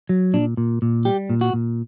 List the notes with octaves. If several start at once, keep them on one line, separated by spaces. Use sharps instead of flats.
F#3
A#2 D4
A#2
A#2
G3 G4
A#2
F#4
A#2